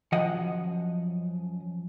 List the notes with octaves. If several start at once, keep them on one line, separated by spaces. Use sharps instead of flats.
F#2 F3 D#5 F#5